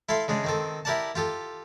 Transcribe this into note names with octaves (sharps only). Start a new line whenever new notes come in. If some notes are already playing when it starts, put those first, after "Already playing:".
E4 A4 F5 C6
C#3 G#3 D4
D#3 C4 A4
E4 G4 A#4 D5 F#5 A5
F4 G4 A4